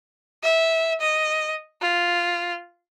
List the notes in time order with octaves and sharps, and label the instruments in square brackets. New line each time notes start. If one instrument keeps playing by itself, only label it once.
[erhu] E5
D#5
F4